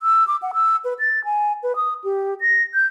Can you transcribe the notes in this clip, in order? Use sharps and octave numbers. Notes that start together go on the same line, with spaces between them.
E6
D6
F#5
E6
B4
A6
G#5
B4
D#6
G4
A#6
G6